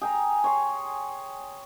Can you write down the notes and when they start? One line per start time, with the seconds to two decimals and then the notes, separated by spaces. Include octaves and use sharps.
0.01 G#4 G5 A#5
0.44 C#5 C6